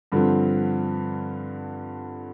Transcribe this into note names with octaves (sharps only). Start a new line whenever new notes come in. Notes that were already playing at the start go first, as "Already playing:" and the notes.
G2 D3 F3 C4